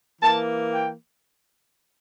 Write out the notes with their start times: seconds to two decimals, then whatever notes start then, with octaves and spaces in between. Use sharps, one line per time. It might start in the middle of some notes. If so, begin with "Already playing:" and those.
0.21 E3 A#3 A5
0.72 G5